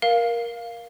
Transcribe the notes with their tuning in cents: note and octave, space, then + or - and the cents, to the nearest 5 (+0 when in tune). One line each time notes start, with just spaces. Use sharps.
A#4 +15 F5 +0